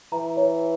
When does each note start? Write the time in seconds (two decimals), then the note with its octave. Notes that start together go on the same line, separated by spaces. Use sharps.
0.12 E3 A#5
0.37 C#5